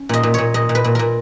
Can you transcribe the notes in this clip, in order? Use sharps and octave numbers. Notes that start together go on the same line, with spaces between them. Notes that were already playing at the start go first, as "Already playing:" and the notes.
Already playing: C#4
A#2 D#5
A#2
A#2 C#5
A#2 D#5
A#2
B4
A#2
A#2 A#4